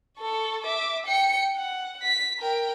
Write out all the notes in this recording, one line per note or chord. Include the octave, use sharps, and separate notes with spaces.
A4 C#6
E5 D6
G5 C#7
F#5
B6
A#4 G5